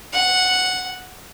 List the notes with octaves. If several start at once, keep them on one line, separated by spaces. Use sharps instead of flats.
F#5